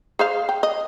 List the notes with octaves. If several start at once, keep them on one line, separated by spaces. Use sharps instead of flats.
G#4 C5 F5
G5
D#5